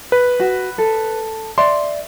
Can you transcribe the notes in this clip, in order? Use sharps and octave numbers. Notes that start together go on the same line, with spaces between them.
B4
F#4
A4
D5 E5 C6